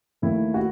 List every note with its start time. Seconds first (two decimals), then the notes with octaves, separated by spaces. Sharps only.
0.22 D#2 D#3 A3 E4
0.54 F#4